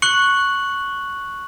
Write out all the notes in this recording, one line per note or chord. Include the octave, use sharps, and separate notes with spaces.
C#6 F#6 C#7 F#7